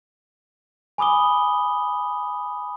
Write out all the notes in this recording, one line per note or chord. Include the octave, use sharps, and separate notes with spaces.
G#5 B5 D6 D#6 G7